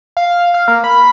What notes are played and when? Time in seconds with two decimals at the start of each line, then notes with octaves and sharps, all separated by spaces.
0.17 F5
0.54 F5
0.68 A#3
0.84 B5